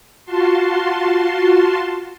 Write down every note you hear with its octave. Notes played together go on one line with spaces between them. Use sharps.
F4 F#4 A5 C6